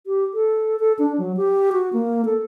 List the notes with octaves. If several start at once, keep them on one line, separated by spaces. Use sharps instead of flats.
G4
A4
A4
D4
F#3
G4
F#4
A#3
A4